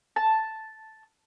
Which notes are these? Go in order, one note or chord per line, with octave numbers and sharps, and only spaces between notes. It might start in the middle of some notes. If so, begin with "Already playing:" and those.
A5